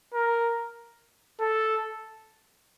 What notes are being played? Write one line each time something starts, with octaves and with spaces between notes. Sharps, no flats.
A#4
A4